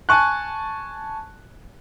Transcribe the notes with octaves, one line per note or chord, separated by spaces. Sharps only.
G#5 A5 C#6 F#6